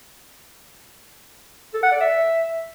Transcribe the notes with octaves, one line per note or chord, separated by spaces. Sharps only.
A4
F#5
D5
E5